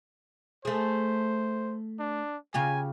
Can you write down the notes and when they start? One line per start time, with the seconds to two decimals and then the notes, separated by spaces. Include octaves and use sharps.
0.65 A3 G#4 C5
1.99 D4
2.54 C#3 F4 G4 G#5